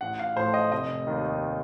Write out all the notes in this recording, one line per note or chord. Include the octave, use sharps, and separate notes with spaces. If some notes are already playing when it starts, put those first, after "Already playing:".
A1 F#5
F5
A2 F3 C5
D#5
F1 D#5
D#2 D#3